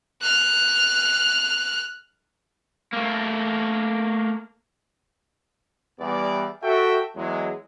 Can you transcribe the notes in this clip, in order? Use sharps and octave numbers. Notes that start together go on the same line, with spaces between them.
F6 F#6
A3 A#3
E2 G3 B3 D5
F#4 A4 E5 G5
E2 F#3 G#3